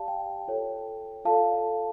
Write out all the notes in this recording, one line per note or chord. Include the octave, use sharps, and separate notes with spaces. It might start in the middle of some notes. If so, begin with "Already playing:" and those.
Already playing: G4 D5 F5 A5
G5
F4 A4 C#5
F4 A4 D5 F5 A5